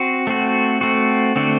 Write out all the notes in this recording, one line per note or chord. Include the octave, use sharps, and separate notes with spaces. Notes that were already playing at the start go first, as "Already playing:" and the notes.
Already playing: C4 F#4
A3 C4 F#4
A3 C4 F#4
D3 A3 C4 F#4